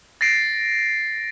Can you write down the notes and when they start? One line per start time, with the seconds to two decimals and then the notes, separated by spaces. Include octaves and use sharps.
0.21 A6 A#6 C7 D7